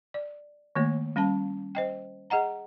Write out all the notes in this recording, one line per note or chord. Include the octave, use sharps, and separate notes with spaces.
D5
D#3 A3 A#3 C#5
G3 C#4 F5 A5
C5 D#5 G5
G#4 D#5 F#5 A#5